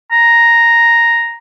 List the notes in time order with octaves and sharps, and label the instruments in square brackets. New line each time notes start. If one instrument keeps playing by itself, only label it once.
[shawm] A#5